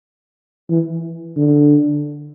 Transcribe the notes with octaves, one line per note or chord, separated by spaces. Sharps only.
E3
D3